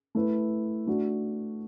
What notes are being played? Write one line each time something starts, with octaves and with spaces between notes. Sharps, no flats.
A3 E4 B4
A3 D4 F#4